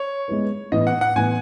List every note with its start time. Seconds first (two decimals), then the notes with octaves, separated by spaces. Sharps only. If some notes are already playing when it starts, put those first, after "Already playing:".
Already playing: C#5
0.28 G#3 B3 E4 B4
0.72 A2 E3 B3 D#5
0.87 F#5
1.01 F#5
1.16 A2 E3 B3 G#5